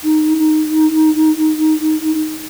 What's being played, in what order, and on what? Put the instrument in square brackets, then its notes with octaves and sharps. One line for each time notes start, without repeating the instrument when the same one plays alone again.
[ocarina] D#4
D#4